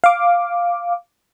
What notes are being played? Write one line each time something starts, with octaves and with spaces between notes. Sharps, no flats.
F5 D6